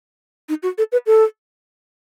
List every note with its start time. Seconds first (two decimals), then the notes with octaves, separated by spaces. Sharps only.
0.49 D#4
0.63 F#4
0.78 A4
0.92 B4
1.07 A4